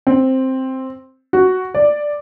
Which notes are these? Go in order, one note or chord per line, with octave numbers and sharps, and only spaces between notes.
C4
F#4
D5